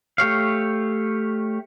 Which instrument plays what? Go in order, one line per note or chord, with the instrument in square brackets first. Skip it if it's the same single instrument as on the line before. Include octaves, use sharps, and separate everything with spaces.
[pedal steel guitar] A3 G4 C#5 F5